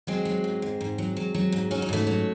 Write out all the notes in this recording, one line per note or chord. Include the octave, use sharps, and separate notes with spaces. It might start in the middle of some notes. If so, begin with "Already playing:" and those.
F#3 G#3 C4
F#3
G#2
G#2
G#2
F#3
F#3
F#3
G#2
F#3 C#4
D#4
G#2 A3 C#4
F#3